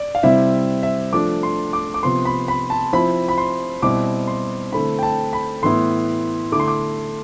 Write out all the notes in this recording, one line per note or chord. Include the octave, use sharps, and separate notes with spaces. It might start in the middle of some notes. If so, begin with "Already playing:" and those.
Already playing: D5
F5
C3 G3 C4 E4 E5
E5
F3 A3 D4 D6
C6
D6
D6
C3 F3 B3 C6
B5
B5
A5
F3 C4 E4 B5
B5
C6
B2 G3 C4 E4 D6
C6
D3 A3 C4 E4 B5
G5
A5
B5
A2 E3 B3 E4 C6
D3 A3 E4 D6
C6
D6